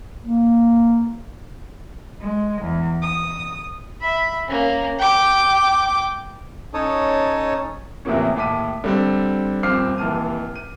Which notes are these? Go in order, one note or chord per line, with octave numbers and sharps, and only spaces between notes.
A#3
G#3
E2
D#6
E5 B5
A#3 C#4
G5 D6
C#4 D#4 A4 C#5 A5 D#6
E2 A2 C3 F3 A#3 C#4
D#2 A2 A5 D6 B6 D#7
D3 G3 C4
D#1 F2 C4 D6 F6 C7
F1 D#2 E3 A5 F6 D#7
D#7